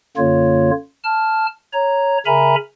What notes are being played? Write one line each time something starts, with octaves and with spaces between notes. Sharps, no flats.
F#2 D3 A#3 F4 C#5
A5 F6
C#5 A#5
C#3 A#4 E5 G#5 A#5 B5